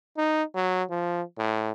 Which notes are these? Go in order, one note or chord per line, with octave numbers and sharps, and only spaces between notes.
D#4
F#3
F3
A2